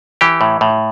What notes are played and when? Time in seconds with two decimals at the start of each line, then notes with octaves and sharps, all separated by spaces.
0.21 E3 G4
0.41 A2
0.61 A2